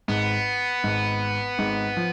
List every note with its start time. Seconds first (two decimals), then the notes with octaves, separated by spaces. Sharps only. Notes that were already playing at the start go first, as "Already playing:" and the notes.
0.08 G#1 G#2 B3
0.83 G#1 G#2
1.58 G#1 G#2
1.97 F3